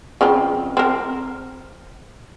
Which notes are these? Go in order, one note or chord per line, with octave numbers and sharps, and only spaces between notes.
C#3 F3 C4
C4 A#4